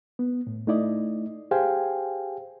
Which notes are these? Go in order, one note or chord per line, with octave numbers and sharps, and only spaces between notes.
B3
A2
A3 D#4 E4 D5 D#5
G4 G#4 C5 F5 G5 G#5